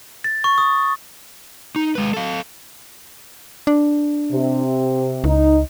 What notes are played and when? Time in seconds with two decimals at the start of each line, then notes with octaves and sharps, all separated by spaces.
0.24 A6
0.44 C#6
0.58 D#6
1.76 D#4
1.95 G#3 B4
2.14 A4 F5
3.67 D4
4.31 C3
5.24 C#2 D#4